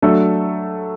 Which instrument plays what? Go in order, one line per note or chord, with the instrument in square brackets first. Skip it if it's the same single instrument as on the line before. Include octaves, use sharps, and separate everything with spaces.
[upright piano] F#3 A3 D4 A4